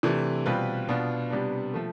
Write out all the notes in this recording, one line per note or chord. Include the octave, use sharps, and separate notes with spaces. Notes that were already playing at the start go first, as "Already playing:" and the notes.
C3 E3 A3 D4
B2 G3 C4 F4 B4
B2 B3 D4 F4
C3 G3 B3 D4
F3 A3